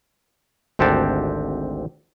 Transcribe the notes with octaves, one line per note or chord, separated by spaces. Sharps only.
G#1 D2 C4 G4 F#5 A5